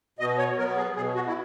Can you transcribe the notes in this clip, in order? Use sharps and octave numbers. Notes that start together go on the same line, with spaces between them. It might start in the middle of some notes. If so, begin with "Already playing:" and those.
B2 D#5
C#5
F#3 B3 A#4
G#4
B2 G#4
F#4
E4